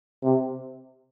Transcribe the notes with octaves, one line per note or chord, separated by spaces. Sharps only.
C3